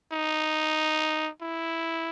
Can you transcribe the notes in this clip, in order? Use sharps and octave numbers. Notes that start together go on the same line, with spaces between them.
D#4
E4